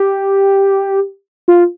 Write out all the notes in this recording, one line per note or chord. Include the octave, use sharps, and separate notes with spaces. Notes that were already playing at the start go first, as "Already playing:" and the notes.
Already playing: G4
F4